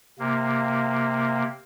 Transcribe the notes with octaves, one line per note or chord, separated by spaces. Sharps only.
C3 A#3